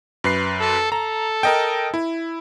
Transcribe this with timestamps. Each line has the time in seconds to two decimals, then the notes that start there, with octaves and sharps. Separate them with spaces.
0.24 F#2 B4 C7
0.60 A4
0.92 A4 A#5
1.43 A#4 D#5 G5
1.94 E4